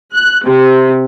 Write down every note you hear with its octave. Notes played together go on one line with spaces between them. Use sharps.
F#6
C3